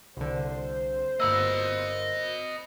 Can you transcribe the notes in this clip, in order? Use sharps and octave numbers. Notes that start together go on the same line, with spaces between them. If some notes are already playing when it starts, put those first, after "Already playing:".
C2 D3 C5
G1 A#3 D#5 B5 E6